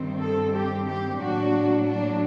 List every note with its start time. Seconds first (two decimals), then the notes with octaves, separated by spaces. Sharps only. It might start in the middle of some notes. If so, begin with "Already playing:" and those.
Already playing: G2 D#3 G3 C4
0.20 A4
0.54 G4
0.87 G4
1.20 A2 F#3 A#3 D4 F#4
1.87 D4